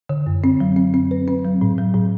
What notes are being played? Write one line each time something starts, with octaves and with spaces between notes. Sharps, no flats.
D3
F#2
C4
F#3
C4
C4
B4
C4
F#3
A2
F#3
A2